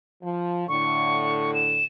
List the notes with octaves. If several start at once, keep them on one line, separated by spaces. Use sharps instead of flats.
F3
A2 D3 C#6
E7